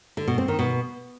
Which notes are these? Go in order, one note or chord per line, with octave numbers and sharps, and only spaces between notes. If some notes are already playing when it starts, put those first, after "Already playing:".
D3
B2
C4
D#3
B2